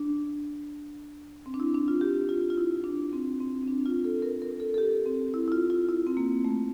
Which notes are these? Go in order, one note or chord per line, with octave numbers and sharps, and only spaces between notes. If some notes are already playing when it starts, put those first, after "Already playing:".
Already playing: D4
C4
D4
E4
D4
F4
G4
F4
F4
E4
D4
C4
C4
C4
D4
F4
A4
A#4
A#4
A4
A4
G4
C4
E4
E4
F4
F4
E4
C4
A#3
A3